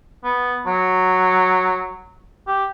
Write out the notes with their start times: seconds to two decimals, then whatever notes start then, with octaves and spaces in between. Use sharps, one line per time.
0.24 B3
0.66 F#3
2.47 G4